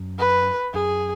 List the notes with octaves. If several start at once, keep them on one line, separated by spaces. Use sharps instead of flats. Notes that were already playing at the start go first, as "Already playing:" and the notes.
Already playing: F#2
B4
F#2 G#4